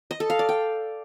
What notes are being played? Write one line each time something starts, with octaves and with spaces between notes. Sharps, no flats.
D#5
A4
F5
D5
G5